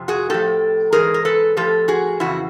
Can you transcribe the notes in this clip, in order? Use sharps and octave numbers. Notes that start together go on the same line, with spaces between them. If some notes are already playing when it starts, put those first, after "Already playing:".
Already playing: F2 C3 F3
F#4 G#4
A2 F3 G4 A4
G#2 E3 G#4 A#4
A#4
A4 B4
A2 F3 G4 A4
F#4 G#4
F2 C#3 E3 E4 F#4